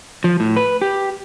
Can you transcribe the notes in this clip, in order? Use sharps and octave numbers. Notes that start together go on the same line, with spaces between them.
F3
A2
B4
G4